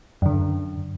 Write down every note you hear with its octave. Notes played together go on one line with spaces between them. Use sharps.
F#2 D3